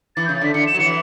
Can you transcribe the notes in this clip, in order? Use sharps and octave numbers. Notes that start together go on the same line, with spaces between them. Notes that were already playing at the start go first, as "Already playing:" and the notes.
E3 A6
C#3 G6
A6
D3 B6
D3 C#7
E7
F#3
E3 C#7